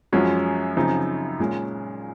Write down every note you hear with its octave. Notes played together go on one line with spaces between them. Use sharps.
F#2 F3 G#3 C#4 F#4
F#2 C#3 F3 C4 D#4
A#2 G#3 C#4